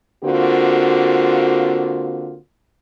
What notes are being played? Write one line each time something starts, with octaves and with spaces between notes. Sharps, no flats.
D3 A#3 C4 F4 F#4